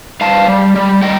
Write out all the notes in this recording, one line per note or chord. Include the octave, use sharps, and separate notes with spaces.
G2 F5 A5
G3
G3
G3 D#5 G5